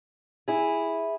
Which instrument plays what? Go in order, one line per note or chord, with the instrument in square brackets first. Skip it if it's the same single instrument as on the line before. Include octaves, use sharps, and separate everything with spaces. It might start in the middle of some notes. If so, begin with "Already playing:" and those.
[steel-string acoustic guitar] E4 G#4